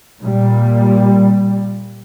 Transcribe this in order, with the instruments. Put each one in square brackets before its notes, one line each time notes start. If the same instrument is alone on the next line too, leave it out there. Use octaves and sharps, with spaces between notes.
[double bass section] A#2 G3